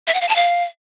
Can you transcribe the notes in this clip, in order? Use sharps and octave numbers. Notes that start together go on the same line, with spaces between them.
E5
F#5
F5
A5
F5